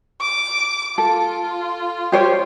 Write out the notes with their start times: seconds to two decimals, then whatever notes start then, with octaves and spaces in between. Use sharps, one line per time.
0.21 D6
0.98 F4 A4
2.12 G4 C5 C#5